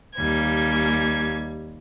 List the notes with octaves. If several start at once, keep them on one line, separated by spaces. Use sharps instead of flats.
D#2 G3 G#6